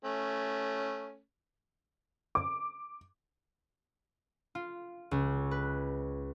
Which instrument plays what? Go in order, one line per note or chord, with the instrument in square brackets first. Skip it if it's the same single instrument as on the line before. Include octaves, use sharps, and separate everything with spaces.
[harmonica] A3 C#4
[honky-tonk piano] D6
[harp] F4
C#2
B4